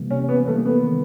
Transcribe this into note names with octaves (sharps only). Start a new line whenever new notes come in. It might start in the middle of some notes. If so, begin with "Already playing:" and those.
Already playing: C3 E3 G3 A#3
C3 C#4
B3
E3 G3 A3 A#3
B3
D#3